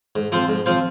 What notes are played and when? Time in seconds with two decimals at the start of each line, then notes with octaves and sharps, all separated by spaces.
0.16 G#2
0.32 F3 C4 F4 C5
0.48 G#2
0.66 F3 C4 F4 C5